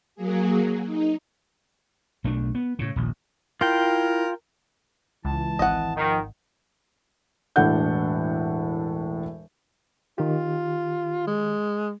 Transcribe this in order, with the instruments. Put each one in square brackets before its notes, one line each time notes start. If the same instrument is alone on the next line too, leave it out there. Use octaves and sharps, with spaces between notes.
[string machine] F#3 A#3 G#4
D#4
[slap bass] B1 A3 C#4 D4
B3
A2 C#3
D#1 A#1
[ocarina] E4 [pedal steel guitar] F4 G5 [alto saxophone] A#4
[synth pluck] C#2 [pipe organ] E3 A5
[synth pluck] G#1 [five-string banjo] D#5 F#5
[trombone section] D#3 [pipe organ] F3
[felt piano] E1 A2 D4 A4 F#5 G6
[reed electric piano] D#3 G4 [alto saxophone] F4
[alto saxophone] G#3